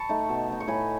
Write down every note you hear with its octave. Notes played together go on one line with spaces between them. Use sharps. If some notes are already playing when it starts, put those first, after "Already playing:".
Already playing: A5 B5 C#6
A3 D#4
B2
A3 D#4
C#6
A2 G#5 B5